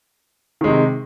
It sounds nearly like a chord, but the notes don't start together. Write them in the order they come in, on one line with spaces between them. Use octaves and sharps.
D#3 G#3 C3